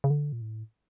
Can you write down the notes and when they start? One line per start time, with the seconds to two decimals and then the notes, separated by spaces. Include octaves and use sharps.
0.04 C#3
0.10 D3
0.32 A#2
0.41 A2